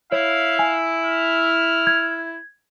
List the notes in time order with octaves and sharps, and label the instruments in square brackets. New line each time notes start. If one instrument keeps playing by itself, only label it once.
[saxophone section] E4 [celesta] C#5 [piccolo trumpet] F5
[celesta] G#5
[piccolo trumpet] F6
[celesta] G#6